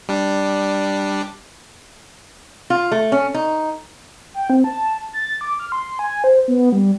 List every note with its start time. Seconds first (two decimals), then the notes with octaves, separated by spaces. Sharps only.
0.09 G3 D4
2.70 F4
2.92 A3
3.12 C#4
3.34 D#4
4.34 G5
4.50 C4
4.64 A5
5.13 A6
5.41 D6
5.59 F6
5.72 C6
5.99 G#5
6.24 C5
6.48 B3
6.72 G3